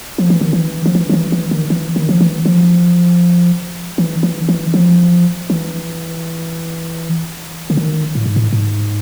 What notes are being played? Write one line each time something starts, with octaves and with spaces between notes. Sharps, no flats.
F3
E3
D#3
E3
F3
E3
F3
E3
E3
D#3
E3
D#3
F3
E3
F3
E3
E3
E3
F3
E3
D3
D#3
A2
G#2
A2
G#2